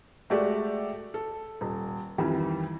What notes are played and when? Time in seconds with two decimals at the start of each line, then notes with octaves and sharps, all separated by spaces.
0.30 G#3 A3 F#4 G4 D5
1.14 A4
1.61 D#1
2.18 F2 D#3 E3 G3